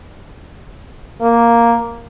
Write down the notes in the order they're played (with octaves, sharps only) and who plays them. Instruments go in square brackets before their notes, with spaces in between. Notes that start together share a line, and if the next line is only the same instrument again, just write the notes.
[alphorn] A#3